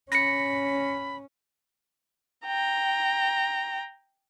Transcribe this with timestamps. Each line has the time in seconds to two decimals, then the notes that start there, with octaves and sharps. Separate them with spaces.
0.12 C#4 B5 A#6 C#7
2.47 G5 A#5